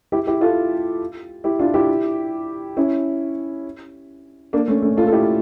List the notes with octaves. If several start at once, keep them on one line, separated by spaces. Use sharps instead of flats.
E4 G4
E4 G4
F4 A4
E4 G4
D4 F4
E4 G4
C#4 E4
A#3 D4
A3 C#4
A3 C#4
F4 A4
A4
E4 G4